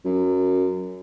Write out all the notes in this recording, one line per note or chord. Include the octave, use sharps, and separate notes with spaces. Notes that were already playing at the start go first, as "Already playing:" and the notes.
F#2